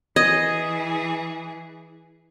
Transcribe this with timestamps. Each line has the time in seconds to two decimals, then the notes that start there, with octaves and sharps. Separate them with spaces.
0.16 E3 G#4 D#5 D#6 G#6